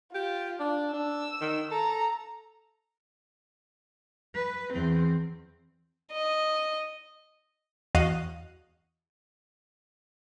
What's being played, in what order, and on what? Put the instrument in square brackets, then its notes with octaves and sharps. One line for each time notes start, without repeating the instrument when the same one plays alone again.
[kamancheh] F4 [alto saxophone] G4
[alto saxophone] D4
[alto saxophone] D4 [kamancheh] E6
[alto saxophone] D#3
[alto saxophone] A4 [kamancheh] A#5
[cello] B4
E2 C4
[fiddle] D#5
[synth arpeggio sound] E2 F#4 D#5 F5 F#6 D#7